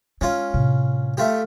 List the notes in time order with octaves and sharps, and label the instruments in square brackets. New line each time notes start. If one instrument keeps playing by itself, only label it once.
[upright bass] G#3 [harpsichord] C#4 F4
[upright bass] A2 C3
[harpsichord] A3 F4 G4